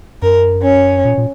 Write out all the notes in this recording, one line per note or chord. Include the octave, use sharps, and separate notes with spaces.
F#2 A#4
C#4
A#2
A#2